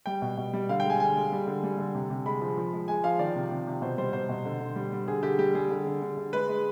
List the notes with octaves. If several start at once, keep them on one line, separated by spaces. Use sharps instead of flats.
G3 G5
B2
B2
G3
D3 F5
G5
G#3 G#5
D3 G#5
G#3
G3
D3
G3
D3
C3
C3
G#3 B5
F3
F3
G#3
G#3 G#5
F3 F5
D#3 D5
C3
C3
C3
B2 C5
G3 C5
B2 C5
B2
D3
D3
G3
G3
D3 G#4
D3 G4
G3 G4
G3 G#4
D3
D3
D3
D3
G#3 B4
G#3